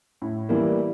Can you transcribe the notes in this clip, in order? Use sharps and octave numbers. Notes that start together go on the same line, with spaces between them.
A2
E3 G3 A#3 E4